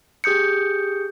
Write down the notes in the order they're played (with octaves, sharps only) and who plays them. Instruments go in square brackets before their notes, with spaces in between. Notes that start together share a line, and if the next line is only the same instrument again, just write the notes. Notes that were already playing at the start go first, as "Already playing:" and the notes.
[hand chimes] G4 G#4 D#6 G6 C#7